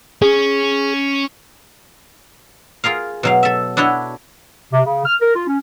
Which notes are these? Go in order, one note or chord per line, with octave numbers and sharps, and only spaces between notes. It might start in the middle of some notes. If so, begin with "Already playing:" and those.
C#4 G#4
F4 G#4 A#4 F5
B2 F#3 F5
A4 E5
D4 E4 F#4 C#5 D#5
C3
C#3
F6
A#4
F4
C#4